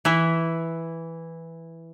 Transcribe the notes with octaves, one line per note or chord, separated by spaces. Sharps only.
E3 E4